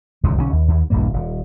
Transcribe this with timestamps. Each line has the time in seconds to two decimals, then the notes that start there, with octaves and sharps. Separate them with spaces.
0.23 E1 C#2 F#2 D#3
0.37 B1 D3 F#3 C#4
0.53 D#2
0.68 D#2
0.90 D1 A#1 G2 A#3
1.13 D#1